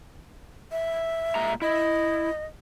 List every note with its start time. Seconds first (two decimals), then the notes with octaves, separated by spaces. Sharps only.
0.72 E5
1.35 A#2 G#3 A#5
1.62 E4 D#5